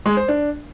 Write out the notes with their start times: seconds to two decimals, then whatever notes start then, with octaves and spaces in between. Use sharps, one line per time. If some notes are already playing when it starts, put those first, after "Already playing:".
0.06 G#3
0.17 C5
0.28 D4